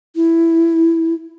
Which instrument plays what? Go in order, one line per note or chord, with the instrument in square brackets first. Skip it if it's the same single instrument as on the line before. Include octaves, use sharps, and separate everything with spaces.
[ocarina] E4